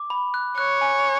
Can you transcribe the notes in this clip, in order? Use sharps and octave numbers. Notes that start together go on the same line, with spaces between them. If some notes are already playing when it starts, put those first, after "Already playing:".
Already playing: D6
B5
F#6
C#5 F#6
G#5